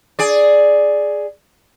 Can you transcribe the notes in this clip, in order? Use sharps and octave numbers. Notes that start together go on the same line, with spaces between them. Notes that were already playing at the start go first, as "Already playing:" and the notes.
G#4 D5